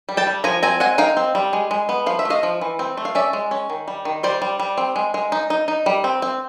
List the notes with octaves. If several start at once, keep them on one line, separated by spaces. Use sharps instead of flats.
G3
G5 A5
G3
F3 G#5 A#5
C4 G#5 A#5
G#3 F#5 G#5
D#4 F5 G5
C4
G3
G#3
G#3
B3
F3 F5
E5
A3
D#5 F5
F3
E3
C4
A3
F5
C#4 D5 E5
G#3
C#4
D#3
G3
D#3
G3 C5 D5
G3
G3
C4
G#3
G#3
D#4
D#4
D#4
G3
C4
C4